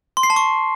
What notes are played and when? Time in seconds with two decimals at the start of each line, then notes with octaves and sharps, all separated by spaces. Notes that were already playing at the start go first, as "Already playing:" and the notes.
0.17 C6
0.23 C7
0.30 A5
0.36 C#6